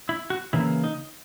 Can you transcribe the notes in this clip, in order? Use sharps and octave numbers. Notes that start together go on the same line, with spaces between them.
E4
F#4
C#3 E3 A#3 E4
D#4